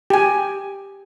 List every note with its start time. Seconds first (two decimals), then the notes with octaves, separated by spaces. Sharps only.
0.10 G4 G#5